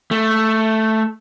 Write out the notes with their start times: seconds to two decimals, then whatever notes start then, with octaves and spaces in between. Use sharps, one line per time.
0.11 A3